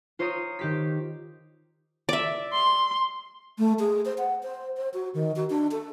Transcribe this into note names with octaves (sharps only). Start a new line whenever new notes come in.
F4 C5 C#5 A#5 D#6
D#3 G4 B6
D5 E5
C6
A3
G#4
C5
F#5
C5
C5
F#4
D#3
F#4
D4
A4